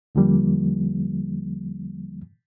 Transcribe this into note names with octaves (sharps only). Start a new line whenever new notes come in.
E2 D3 F3 G3 A#3